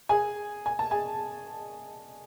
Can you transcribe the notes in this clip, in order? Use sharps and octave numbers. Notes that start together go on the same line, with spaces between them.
G#4 G#5
G#5
A5
G#4 G#5